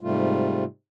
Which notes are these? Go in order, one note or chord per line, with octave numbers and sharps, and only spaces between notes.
G#2 C3 G3 A3 F4